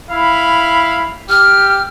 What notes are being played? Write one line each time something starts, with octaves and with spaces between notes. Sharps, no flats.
E4 F5 B5
G4 F6